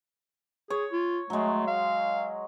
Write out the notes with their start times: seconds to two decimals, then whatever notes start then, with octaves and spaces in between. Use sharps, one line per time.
0.70 G#4 C#5
0.92 F4
1.30 F#3 G#3 A3
1.67 F5